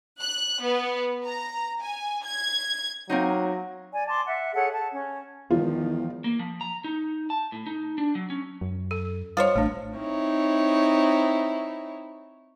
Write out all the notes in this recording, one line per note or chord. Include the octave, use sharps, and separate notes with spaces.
F#6
B3
A#5
G#5
G#6
F#3 A#3 C4 D#4
D5 G#5
A5 C6 D6
E5 F#5
G#4 A4 C#5 F#5
A5
C#4
E2 D#3 F3 G#3 F4
A#3
F3
A#5
D#4
A5
A2
D#4
D4
F#3
C#4
F#2
A4
G3 F4 C5 C#5
A1 A3 D4
C4 D#4 E4 C#5